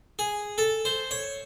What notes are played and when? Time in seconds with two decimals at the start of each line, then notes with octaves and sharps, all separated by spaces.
0.19 G#4
0.58 A4
0.85 C5
1.11 C#5